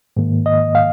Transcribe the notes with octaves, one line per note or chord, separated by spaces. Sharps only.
G#2 D#3 A#3
D#5
F5